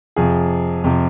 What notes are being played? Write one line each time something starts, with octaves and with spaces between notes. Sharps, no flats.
F2 C3 F3 G#4
F2 C3 F3